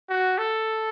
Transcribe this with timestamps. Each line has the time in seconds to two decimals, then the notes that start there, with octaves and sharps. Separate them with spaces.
0.09 F#4
0.38 A4